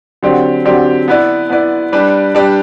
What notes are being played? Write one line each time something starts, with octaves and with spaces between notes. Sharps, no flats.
D3 F#3 C4 G4 D5
D3 F#3 C4 G4 D5
B3 E4 B4 D5
B3 E4 B4 D5
G3 D4 G4 B4 D5
G3 D4 G4 B4 D5